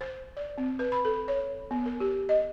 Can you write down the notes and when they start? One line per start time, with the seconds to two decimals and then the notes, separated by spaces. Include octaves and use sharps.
0.01 C5
0.37 D5
0.58 C4
0.79 B4
0.92 B5
1.05 A4
1.28 C#5
1.71 B3
1.86 A#4
2.00 G4
2.29 D#5